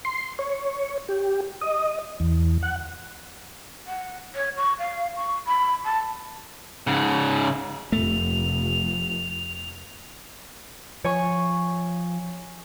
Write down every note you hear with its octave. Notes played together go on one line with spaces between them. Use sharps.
C6
C#5
G4
D#5
E2
F#5
F#5
C#5
C#6
F5
C#6
B5
A5
G#2 C#3
F1 A3 F7
F3 C#5 G#5 C#6